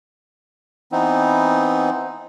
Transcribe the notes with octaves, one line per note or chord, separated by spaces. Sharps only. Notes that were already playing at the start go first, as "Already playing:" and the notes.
E3 B3 C4 D#4